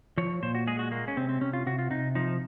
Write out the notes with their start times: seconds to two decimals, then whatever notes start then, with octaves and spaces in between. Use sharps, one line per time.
0.18 F3 C#5
0.43 A#2 C5
0.55 F#4
0.67 G#3 G#4
0.79 F#4
0.92 G#3 A#3
1.08 C#4
1.17 C3 C4
1.29 C4
1.41 C3 C#4
1.53 F4
1.66 C3 F#4
1.79 F4
1.91 C3 D#4
2.15 F3 D#4